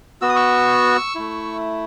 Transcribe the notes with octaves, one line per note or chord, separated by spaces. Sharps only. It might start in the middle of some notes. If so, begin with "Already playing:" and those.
B3 F#4 E6
D#6
C#6 E6
A3 E4